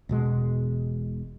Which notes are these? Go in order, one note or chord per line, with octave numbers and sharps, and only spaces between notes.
E1 B2 G#3